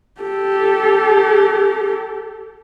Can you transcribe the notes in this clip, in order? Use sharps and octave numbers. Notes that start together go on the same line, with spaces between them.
G4 A4